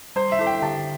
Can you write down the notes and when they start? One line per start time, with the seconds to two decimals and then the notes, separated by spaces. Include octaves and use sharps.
0.16 G3 C5
0.32 E5
0.39 E4 A4
0.47 G5
0.62 D3 A5